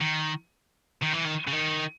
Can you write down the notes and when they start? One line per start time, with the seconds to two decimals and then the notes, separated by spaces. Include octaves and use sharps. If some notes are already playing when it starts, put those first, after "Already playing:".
0.01 D#3
1.02 D#3
1.14 E3
1.25 D#3
1.48 C#3
1.53 D#3